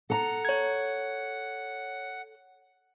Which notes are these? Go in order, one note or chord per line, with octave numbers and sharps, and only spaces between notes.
A4 F#5 A#5
C#5 G#6